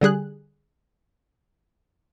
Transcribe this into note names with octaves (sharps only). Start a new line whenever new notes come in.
D3 G3 G#4 F#6